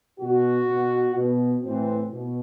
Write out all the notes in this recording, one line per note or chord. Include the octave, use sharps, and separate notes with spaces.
B2 F#4
B2
B2
A2 E3 C4
B2